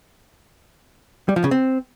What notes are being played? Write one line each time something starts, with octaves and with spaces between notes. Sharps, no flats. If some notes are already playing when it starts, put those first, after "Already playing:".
G3
F3
C#3
C4